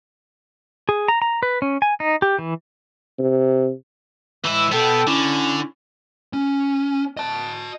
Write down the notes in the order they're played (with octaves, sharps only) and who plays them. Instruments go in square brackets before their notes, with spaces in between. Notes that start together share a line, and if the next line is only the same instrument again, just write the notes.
[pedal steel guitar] G#4
A#5
A#5
B4
C#4
G#5
D#4
G4
E3
[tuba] C3
[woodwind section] A2 G#3 E6 [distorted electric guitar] E3 E4
[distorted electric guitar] B2 B3 [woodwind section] A4 G5
[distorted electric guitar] D3 [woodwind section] C#4 E4
[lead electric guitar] C#4
D#5 A5